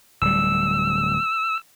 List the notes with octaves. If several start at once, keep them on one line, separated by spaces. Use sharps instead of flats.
D1 G3 E6